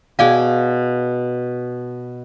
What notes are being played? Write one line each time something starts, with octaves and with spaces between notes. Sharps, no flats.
B2 G#4 D5 F5 G5 G#5